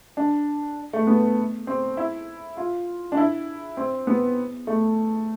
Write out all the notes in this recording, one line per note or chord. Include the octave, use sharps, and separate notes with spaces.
D4
A3
B3
C4
E4
F4
D4
E4
C4
B3
A3